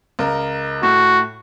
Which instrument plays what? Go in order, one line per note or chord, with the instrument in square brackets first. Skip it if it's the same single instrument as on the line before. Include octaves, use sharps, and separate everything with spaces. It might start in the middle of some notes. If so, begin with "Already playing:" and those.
[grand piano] C#2 A#4
[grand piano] A2 [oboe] F#4